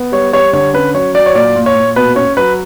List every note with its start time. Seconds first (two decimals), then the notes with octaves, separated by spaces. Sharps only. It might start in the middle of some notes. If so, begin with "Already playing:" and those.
Already playing: B3
0.12 G3 C#5
0.33 G3 C#5
0.53 D3 C#5
0.74 C#4 B4
0.94 F#3 C#5
1.15 F#3 D5
1.26 C#5
1.35 A#2 D5
1.56 A#2
1.66 C#5
1.76 A#2
1.96 B2 B4
2.16 C#4 C#5
2.37 F#3 B4